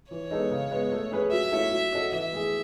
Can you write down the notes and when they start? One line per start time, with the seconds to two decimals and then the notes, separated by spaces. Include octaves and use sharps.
0.11 E3 C#5
0.31 G#3 B3 D#4 A4
0.51 C#3
0.71 G#3 B3
0.92 A3
1.11 C#4 G#4 B4
1.32 F#3 E5
1.52 A3 C#4 E4 A4
1.71 F#3
1.92 C#4 F#4 A4 D#5
2.12 E3 E5
2.32 A3 E4 G#4